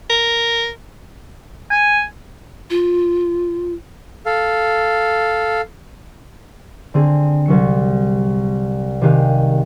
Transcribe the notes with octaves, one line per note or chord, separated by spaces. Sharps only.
A#4
G#5
F4
A4 F5
D3 C4 G#4
C2 F#3 C#7
C3 D#3 G4 G#4 F5 F#6